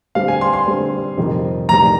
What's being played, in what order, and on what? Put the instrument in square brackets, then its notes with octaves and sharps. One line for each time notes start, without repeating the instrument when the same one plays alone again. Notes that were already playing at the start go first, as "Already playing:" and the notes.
[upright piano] D3 G3 C4 [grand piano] F5
[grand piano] G#5
C6
C6
[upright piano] D3 G3 C4
F2 C3 D#3 G3
[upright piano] F2 C3 D#3 G3 [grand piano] A#5